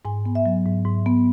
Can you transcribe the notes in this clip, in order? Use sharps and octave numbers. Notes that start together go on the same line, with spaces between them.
G#2 G#5
B3
E5
F#3
G#2
G#2
B3